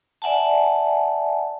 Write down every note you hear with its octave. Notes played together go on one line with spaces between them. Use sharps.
D5 E5 F#5 G#5 A5